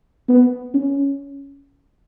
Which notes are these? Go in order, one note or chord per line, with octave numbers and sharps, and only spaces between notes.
B3
C#4